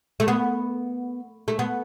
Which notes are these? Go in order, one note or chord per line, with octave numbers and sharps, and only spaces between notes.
A3
B3
A3
B3